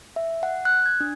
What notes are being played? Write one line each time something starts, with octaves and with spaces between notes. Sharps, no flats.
E5
F#5
F#6
G#6
D4